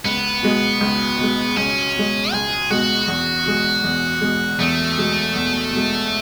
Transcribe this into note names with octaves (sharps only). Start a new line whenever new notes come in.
C#2 B3
B2 G#3
C#2
B2 G#3
C#2 C#4
B2 G#3
C#2 G#4
B2 G#3 F#4
E2
B2 G#3
E2
B2 G#3
E2 A3
B2 G#3
E2
B2 G#3